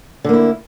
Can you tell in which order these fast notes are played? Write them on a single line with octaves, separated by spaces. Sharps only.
D3 A#3 E4